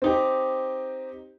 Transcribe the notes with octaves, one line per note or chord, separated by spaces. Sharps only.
C4 D#4 G4